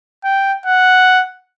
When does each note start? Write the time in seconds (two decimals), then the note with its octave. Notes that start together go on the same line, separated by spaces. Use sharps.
0.24 G5
0.66 F#5